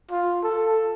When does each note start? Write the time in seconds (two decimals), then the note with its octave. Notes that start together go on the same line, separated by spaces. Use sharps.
0.11 F4
0.43 A4